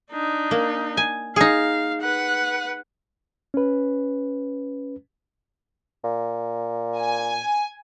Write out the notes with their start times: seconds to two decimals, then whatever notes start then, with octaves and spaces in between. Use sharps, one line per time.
0.11 D4 D#4
0.51 A#3
0.97 G#5
1.36 D#4 G#4 F5
2.02 B4 F#5
3.54 C#4 B4
6.04 A#2
6.99 G#5